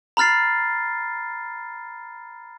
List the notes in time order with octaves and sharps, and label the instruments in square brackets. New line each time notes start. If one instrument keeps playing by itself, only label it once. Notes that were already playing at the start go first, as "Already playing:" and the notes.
[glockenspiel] A#5 B5 F6 A6 C7